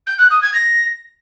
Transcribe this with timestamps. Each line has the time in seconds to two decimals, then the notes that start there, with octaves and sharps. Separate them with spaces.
0.07 G6
0.18 F#6
0.30 D#6
0.42 G#6
0.54 A#6